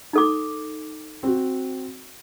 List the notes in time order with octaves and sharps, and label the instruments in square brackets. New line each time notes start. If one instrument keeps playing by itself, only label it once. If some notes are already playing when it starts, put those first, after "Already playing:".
[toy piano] D#4 A4 D6
[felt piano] C4 F#4